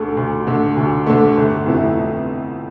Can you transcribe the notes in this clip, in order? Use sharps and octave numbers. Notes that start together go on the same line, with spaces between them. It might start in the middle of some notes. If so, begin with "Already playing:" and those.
Already playing: D2 D3 A3
D2
D3 A3
D2
D3 A3
G1
F2 E3 A3 E4